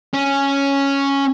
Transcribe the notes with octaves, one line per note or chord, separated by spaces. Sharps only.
C#4